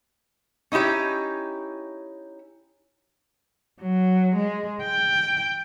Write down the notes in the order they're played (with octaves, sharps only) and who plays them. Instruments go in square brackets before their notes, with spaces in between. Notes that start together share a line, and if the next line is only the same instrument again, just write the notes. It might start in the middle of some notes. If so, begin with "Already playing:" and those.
[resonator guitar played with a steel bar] C#4 D#4 E4 G4 C#5
[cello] F#3
G#3
G5